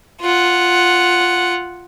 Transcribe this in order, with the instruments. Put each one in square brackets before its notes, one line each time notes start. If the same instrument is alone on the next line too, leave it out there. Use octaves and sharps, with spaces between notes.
[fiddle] F4 F#5